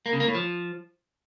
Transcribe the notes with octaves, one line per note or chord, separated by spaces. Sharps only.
A#3
C#3
A#3
A2
F3